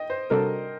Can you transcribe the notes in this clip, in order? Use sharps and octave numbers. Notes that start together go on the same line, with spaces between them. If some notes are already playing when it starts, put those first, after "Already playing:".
Already playing: D#5 G5
C5
C3 G3 D4 F#4 A4 A#4